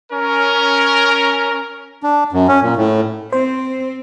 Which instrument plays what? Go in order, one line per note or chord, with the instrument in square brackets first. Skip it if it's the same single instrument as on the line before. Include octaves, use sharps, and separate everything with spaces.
[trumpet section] C#4 A#4
[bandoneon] D4
F#2
C#4
A#2
A2
[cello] C4 [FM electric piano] C5